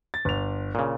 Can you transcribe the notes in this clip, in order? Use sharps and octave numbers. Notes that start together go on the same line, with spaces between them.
A6
G1 F7
A#2 C#3